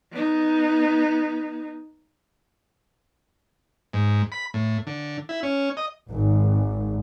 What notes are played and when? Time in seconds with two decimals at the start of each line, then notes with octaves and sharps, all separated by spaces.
0.11 B3 D#4
3.93 G#2
4.32 B5
4.54 A2
4.87 D3
5.29 E4
5.43 C#4
5.77 D#5
6.10 G#1